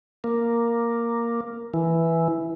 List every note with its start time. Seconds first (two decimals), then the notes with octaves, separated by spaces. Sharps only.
0.24 A#3
1.74 E3